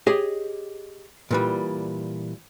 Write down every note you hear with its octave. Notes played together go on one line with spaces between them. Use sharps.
G4 G#4 C#5 D#5
A#2 E3 G3